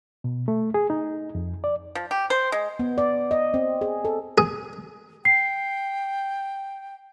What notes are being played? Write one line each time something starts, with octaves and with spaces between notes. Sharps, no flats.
B2
A3
G#4
D#4
F2
D5
F3
G4
C5
G#3
B3
D5
D#5
C4
G#4
A4
G#4
G5 C7